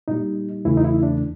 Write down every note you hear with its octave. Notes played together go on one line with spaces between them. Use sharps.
A#2 G3 D#4
E2 C#3 E3 A3 E4
D#4
E4
D4